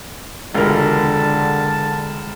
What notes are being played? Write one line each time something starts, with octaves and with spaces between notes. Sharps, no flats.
E1 C#2 D3 A#4 A5